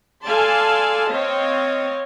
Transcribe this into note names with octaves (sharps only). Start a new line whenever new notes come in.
A4 D5 F5 G#5 A5 C6
C4 C#5 D#5 F5